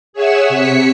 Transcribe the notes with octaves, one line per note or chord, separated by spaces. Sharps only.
G#4 C#5 E5 F#5 G#5 E6
C3 B6 C#7